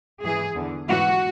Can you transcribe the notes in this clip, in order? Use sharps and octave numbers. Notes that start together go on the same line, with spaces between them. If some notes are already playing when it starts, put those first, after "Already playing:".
G#2 E3 G#4
E2 D3
G#2 E3 F#4